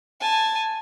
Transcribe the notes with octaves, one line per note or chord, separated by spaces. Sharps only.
G#5 A5